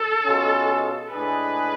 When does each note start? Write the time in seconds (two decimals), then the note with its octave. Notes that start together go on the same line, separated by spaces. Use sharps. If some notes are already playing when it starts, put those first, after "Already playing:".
Already playing: A4
0.25 B2 G#3 C#4 F4
1.11 A2 G#3 D4 G#4 B4